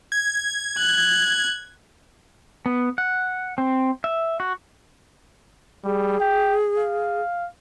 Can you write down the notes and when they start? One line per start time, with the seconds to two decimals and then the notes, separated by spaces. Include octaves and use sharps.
0.12 G#6
0.78 F#6
2.66 B3
2.98 F#5
3.58 C4
4.04 E5
4.40 F#4
5.85 G3 G#4
6.21 G5
6.78 F5